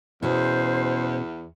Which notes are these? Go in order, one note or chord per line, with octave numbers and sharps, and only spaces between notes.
E2 B2 C#4 G#4 C5